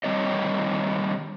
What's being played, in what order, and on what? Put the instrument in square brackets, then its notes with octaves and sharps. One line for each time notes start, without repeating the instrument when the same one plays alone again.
[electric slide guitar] D#3 G3 C4 C#5 D#5